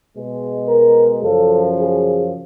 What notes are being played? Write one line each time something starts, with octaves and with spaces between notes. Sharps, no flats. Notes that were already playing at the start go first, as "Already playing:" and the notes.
B2 G#3
A#4
F#2 C#3 F3 A4
G#4